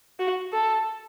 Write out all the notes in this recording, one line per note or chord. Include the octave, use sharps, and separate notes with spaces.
F#4
A4